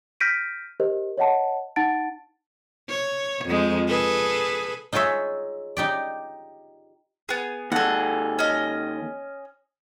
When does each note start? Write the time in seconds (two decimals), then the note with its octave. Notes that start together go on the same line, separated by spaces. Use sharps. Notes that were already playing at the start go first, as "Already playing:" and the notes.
0.20 F6 G6 A#6 B6 D7 D#7
0.80 G4 A#4 C5 D#5
1.18 C#5 D#5 F#5 A5
1.76 D#4 F#5 A5 A6 D7
2.89 C#5
3.45 F2 G#3
3.88 G#4 A4 B4
4.93 D#4 F4 G#4 C#5 E5
5.77 D#4 G4 D5
7.29 B3 G#4
7.72 D#2 G#4 A4 F#5
8.39 C#4 D#5